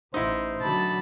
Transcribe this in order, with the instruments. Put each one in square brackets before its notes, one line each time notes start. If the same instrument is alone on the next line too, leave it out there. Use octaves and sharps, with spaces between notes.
[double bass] A1 [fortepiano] D#4 E4 [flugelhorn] C5
[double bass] D3 F#3 [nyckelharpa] A5 B5